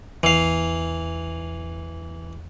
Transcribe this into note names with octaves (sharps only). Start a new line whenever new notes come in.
E2 E3 F5